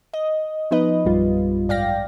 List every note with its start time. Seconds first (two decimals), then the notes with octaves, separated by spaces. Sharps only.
0.13 D#5
0.71 F3 B3 D#4 B4 D#5
1.05 A#1 F#2 G3 F4
1.69 G#2 D5 F5 G5 A#6